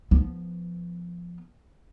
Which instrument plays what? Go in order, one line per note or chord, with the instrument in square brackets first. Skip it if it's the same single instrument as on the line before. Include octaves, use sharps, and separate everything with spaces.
[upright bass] F3 B3